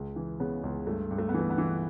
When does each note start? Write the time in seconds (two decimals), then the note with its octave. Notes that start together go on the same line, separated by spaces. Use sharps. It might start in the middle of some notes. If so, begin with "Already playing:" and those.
Already playing: C#2
0.16 E3
0.40 C#3 B3
0.63 C#2
0.87 G2 A3
1.11 G2
1.18 A3
1.29 B3
1.34 E3 A3
1.50 B3
1.58 E3